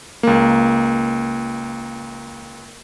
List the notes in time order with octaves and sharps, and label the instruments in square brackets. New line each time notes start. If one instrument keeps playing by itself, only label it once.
[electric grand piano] C#2 A#3